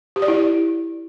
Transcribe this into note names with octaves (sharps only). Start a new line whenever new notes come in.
G4
D5
E4